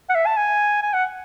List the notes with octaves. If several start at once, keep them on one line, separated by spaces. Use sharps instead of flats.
F#5
E5
A5
G#5
G#5
F#5